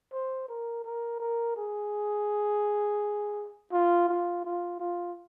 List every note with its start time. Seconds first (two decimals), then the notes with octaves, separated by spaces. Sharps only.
0.12 C5
0.48 A#4
0.84 A#4
1.20 A#4
1.56 G#4
3.72 F4
4.08 F4
4.44 F4
4.80 F4